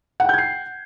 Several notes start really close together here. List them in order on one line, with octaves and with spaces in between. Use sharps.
F#5 G5 G6 G#6 C7